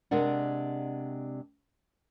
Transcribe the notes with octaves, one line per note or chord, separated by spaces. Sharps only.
C3 G#3 D4 A#4 D5 F#5